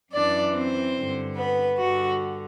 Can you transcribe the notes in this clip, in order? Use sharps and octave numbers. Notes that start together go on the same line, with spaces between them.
F#2 E3 D4 D5
C4 C5
G2 D3
B3 B4
G2 D3 F#4